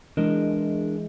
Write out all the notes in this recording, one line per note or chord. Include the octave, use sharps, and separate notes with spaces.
E3 G#3 D4 A#4 D#5